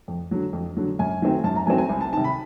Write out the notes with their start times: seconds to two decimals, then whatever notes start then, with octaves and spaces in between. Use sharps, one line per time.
0.08 F2
0.31 D3 F#3
0.53 F2
0.77 D3 F#3
0.99 F#2 G#5
1.22 D#3 F#3 A3 C4
1.44 F#2 A5
1.56 A#5
1.67 D#3 F#3 A3 C4 G#5
1.78 G#5
1.89 C2
2.01 A5
2.13 C3 D#3 A5
2.24 B5